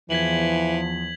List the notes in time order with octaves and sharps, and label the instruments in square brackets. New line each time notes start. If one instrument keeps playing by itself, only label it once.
[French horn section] E2 F3 [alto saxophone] E3 [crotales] G#6 B6 F#7